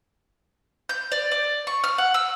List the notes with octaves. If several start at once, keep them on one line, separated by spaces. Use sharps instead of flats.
G6
D5
D5
C#6
F6
F#5
E6